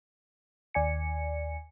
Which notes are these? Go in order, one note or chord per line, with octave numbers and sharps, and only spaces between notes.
D#2 D5 G#5 C#7